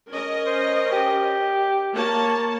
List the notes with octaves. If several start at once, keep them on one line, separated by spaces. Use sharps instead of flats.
C#4 A#4 D#5
C5
G4
A#3 C#5 A5